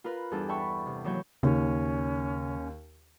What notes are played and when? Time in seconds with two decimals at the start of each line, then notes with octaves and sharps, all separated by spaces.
0.04 F4 A#4 B4
0.31 E2 G2 D4 G#4 A4
0.49 E5 G5 A5 B5 C#6
0.86 C3
1.04 D#2 E3 F#3 C#5 G6
1.43 D#2 C#3 C#4